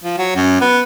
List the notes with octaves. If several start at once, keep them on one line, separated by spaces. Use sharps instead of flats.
F3
F#3
F#2
B3